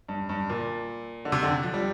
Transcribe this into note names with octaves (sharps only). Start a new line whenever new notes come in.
G2
G2
A#2
D3
C3
D3
F3
G3